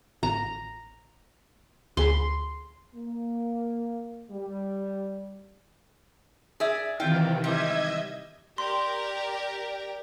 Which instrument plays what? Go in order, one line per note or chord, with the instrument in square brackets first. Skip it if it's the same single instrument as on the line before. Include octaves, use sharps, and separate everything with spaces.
[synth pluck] A1 [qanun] A#5
[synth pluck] D2 G#4 B5 [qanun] C6
[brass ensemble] A#3
G3
[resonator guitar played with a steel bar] G#4 D5 E5
[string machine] C3 D#3 E3 [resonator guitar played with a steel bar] F4 G5
[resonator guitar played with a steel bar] G#2 G3 [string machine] D#5 E5 G#6
[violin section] G4 A#4 [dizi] D5 [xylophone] C6